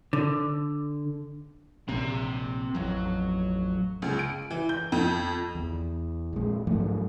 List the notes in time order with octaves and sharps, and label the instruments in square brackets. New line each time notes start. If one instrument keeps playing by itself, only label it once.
[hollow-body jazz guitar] D3
[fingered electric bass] A#1 C3 [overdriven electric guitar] C4 A#5
[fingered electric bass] A1 F2 [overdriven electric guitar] F#3
[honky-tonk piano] C#2
D7
E3
G6
F2
[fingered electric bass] E2
A#1 G#3
G#2 F3 F#3 A3